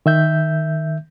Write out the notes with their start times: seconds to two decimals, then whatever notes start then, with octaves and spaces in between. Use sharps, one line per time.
0.06 D#3 E5 G6